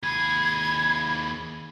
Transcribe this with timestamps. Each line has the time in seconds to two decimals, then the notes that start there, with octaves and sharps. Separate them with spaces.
0.03 D#2 G#4 B5 G#6